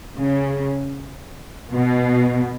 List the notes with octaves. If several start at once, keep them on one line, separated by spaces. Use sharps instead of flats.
C#3
B2